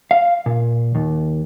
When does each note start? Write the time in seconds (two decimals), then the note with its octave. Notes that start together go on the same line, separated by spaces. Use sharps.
0.11 F5
0.46 A#2
0.95 D#2